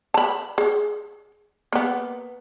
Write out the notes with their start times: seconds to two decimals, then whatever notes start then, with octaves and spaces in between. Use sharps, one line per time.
0.14 A5 B5
0.58 G#4
1.73 A#3 B3